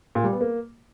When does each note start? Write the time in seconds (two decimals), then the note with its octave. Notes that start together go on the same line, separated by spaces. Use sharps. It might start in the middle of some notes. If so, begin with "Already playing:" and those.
0.15 A#2
0.24 G3
0.32 B3
0.41 A#3